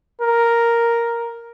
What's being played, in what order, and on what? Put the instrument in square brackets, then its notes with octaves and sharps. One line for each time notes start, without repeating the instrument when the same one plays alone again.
[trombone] A#4